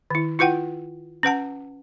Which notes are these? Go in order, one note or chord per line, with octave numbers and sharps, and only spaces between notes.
D#3 E4
E4 F4 B4 F#5 G5
C#4 B4 F#5 A5